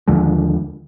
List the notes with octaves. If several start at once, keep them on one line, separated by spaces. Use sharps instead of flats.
D#2 D3 F3 G#3